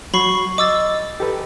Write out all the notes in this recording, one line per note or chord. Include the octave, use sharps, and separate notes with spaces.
F#3 B5 C#6 C7
D#5 D6 E6 A6
G4 A4 B4